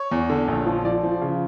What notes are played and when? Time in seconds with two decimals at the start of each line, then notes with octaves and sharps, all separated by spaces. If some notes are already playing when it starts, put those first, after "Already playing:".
Already playing: C#5
0.11 E2
0.30 D3
0.48 A#1
0.66 F3
0.85 F3 D5
1.03 F3
1.21 C#3